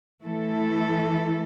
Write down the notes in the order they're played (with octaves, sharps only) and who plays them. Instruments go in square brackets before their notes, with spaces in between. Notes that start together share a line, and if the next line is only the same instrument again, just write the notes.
[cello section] E3 A3 E4 A4